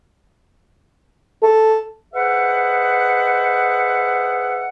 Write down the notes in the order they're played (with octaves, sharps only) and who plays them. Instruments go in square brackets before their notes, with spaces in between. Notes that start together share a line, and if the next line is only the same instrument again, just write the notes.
[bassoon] A4
[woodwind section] G#4 B4 C5 D#5 E5 F#5